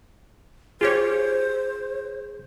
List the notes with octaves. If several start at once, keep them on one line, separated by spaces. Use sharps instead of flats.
F4 G4 G#4 C5 C#5